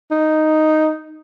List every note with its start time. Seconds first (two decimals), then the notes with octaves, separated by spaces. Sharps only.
0.11 D#4